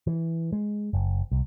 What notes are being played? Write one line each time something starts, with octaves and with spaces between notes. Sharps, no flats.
E3
G#3
F#1
C2